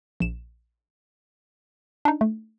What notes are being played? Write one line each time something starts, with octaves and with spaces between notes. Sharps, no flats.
A#1 E7
D4 D#4
A3